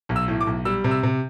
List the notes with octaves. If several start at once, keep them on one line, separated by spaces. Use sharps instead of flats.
B1
E6
A2
D6
B1
G3 E6
C3
E6
C3